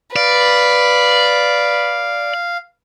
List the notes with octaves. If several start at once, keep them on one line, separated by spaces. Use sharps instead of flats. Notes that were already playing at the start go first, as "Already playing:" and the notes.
B4 D5 F5